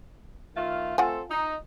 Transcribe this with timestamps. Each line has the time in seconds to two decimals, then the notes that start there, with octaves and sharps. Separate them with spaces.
0.55 D#3 A3 F4
0.98 A3 C4 F4 A4 F#5 G#5
1.30 D#4